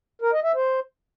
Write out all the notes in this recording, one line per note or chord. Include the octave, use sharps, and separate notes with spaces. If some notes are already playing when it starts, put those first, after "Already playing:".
A#4
D#5
E5
C5